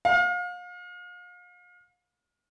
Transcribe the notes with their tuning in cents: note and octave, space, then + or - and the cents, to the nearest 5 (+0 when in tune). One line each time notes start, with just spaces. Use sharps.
F5 +35